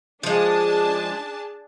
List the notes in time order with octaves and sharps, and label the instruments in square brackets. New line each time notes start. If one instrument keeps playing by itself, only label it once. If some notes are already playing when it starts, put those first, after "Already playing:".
[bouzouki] F3 G#3 [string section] D4 G#4 A5